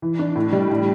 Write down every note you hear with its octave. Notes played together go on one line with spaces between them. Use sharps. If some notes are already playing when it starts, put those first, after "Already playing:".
E3
D4
A2
G3
A2